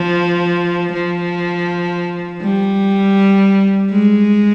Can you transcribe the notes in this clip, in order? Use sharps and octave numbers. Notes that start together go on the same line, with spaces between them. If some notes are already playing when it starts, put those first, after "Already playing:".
Already playing: F3
F3
G3
G#3